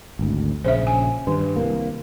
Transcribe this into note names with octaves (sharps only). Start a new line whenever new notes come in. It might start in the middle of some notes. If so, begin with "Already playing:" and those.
G#1 D2
A#1 C#3 C5 E5
G#5
G2 D#3
C2 A#3